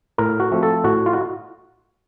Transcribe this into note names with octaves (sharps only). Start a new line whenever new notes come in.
A2 A#4
F#4
F3 A3 C4
A4
A2 F#4
F4
F#4